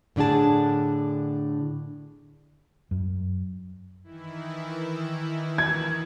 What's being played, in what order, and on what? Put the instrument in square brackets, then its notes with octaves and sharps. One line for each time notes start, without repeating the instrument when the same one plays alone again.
[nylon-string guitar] A2 D3 D4 G#4 A5
[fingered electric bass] F#2
[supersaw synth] D#3 E3 E4
[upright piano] G#6